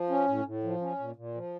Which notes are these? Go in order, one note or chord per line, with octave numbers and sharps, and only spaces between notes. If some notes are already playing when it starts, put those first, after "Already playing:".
Already playing: F3
C#4
A2
A2
F3
C#4
A#2
A#2
F3